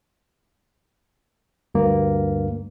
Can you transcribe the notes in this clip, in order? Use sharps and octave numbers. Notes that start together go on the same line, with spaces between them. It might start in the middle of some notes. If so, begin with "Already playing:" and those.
D2 G2 A#3